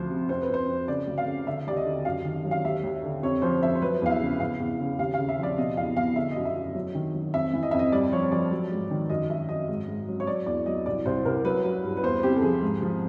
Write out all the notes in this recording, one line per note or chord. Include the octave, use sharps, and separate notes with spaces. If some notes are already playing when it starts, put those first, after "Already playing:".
Already playing: D2 F3 C5
C3
F2 C5
B4
F2 C5
F2
C#3 D5
D2
F5
C#3
D3 E5
D#2 D5
D#5
D3
F#2 F5
D#3
F#3
F5
D#2 E5
D#2
D3
F2 C#5
F3 C5
F2 E5
C5
F#3 B4
E2 F5
E5
C#3
E2 F5
E2
C#3
D#2 F5
C#3 F5
E5
F3 D5
B2 D#5
E2 F5
E2 F5
D3 E5
D#5
F#2
E5
F#2
F#3
D#3
F#3
F2 E5
E3
D#5
F2 E5
D#5
G2 D5
F3 C#5
F3 D5
F#3
G#2
D#3
F#2 D#5
F#2 E5
F#2 D#5
G#2
G#2
F#3
C#5
F#3 D5
E2 D5
F#3 D#5
C2 D5
C2 C5
C2 A#4
F#3 B4
F#3
G2
B4
E2 C5
C3 G4
A4
F3 G#4
G#2
F3